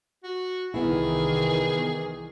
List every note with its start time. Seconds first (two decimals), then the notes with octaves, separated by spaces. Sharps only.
0.24 F#4
0.74 C2 D#3 E3 B3 E4 G#4